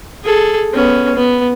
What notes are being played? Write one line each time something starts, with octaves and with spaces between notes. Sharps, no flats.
G#4 A4
B3 C#4
B3